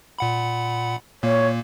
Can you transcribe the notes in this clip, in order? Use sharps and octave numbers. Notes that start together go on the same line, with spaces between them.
A#2 F#5 B5
A#2 A#3 C#5